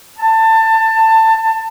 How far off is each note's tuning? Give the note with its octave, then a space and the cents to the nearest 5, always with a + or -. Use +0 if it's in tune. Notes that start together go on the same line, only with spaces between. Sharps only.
A5 +20